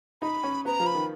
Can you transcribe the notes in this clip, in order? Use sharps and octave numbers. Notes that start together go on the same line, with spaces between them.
D#4 B5
C#4
B3 A#5
F3
B5
D#3